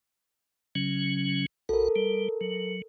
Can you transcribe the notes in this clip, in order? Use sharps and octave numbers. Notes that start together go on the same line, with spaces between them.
C#3 F#3 C#4
B1 F#4 A4 A#4
G3
F#3